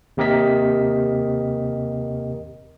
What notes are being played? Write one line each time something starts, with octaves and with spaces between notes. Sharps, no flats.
D#2 C3 G4 A#4 D#5 B6